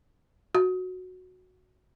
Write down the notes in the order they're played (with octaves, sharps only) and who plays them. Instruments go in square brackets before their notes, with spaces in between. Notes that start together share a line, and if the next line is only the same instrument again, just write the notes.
[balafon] F#4